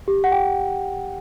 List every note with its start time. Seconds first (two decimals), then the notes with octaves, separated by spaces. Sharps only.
0.08 G4
0.24 F#5
0.32 G5